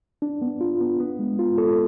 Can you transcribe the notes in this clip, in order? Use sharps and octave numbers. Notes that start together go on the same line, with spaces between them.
D4
B3
F4
B3
B3
G#3
F4
A4